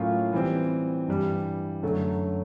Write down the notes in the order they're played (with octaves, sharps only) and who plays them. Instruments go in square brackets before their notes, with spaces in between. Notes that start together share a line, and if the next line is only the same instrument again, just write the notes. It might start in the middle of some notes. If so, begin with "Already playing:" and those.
Already playing: [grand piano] A2 F#3 A#3 C#4 F4
E3 G3 C4
G2 E3 G3
F#2 D3 F#3 A3